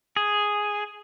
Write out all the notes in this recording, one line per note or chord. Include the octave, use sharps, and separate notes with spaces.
G#4